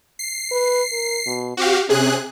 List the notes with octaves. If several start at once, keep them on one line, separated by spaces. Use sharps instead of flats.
C7
B4
A#4
B2
C4 F#4 G4 F5
C3 C#4 G#4 F#6